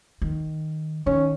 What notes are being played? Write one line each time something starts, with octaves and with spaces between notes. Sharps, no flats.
D#3
D#3 C#4